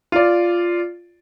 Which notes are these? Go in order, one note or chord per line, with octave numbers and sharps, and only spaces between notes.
F4 D5